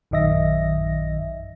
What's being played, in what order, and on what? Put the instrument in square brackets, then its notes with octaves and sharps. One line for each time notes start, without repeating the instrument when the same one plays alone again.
[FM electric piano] A#1 F#2 D#3 D#5 E5 A#6